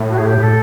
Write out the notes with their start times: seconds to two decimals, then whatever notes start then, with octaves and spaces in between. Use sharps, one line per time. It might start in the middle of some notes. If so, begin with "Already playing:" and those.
Already playing: A2
0.09 F#4
0.17 G#4
0.25 G4
0.38 A2
0.42 A4